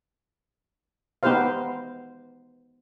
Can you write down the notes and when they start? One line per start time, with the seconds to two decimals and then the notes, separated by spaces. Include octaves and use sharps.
1.23 B3 D#4 G4 B4 C5 F5